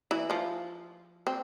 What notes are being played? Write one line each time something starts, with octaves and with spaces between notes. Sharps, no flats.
E3 E4
F3 F4
C4